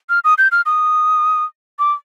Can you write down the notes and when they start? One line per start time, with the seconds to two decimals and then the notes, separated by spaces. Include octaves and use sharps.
0.10 F6
0.24 D#6
0.38 G6
0.52 F6
0.66 D#6
1.79 D6